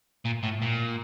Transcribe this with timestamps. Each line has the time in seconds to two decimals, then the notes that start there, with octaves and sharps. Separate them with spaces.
0.25 A#2
0.43 A2
0.62 A#2